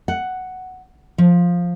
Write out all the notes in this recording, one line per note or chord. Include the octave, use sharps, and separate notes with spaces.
F#5
F3